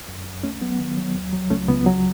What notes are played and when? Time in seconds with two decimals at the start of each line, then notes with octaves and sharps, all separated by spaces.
0.08 F#2
0.26 F#2
0.43 C#2 A3 C#4
0.61 F#3 B3
0.79 D#3
0.97 F#3
1.15 D#2
1.33 F#3
1.50 C#2 A3 C#4
1.68 C#2 B3
1.86 F#3